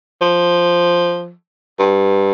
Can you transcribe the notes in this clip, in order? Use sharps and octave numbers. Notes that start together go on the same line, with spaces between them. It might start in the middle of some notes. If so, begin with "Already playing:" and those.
F3
G2